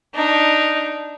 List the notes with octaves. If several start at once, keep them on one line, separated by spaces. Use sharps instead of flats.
D4 D#4